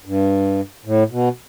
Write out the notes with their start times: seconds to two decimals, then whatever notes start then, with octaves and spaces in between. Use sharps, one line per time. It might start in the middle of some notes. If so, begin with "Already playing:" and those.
0.05 G2
0.85 A2
1.10 B2